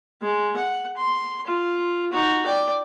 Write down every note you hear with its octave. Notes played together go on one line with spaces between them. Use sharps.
G#3
F#5
C6
F4
D#4 F#4
D5 G5